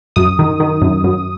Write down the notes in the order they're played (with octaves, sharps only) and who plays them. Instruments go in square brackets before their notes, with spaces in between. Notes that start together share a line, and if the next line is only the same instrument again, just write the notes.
[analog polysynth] F#2 D#6
D#3
D#3
F#2
F#2